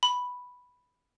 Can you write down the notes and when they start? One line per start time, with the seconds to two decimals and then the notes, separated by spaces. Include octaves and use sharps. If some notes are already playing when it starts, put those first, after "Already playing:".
0.03 B5